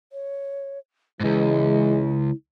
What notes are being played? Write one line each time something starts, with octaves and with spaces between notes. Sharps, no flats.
C#5
C#2 G#2 E3 G#3 E4